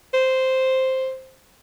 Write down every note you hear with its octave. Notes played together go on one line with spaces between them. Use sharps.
C5